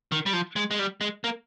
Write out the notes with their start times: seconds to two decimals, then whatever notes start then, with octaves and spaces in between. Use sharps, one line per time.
0.12 D#3
0.26 G3
0.33 F3
0.56 G#3
0.71 G#3
0.79 G3
1.01 G#3
1.24 A#3